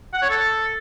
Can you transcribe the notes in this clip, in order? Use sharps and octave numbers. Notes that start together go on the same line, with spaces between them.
F#5
C#5
A4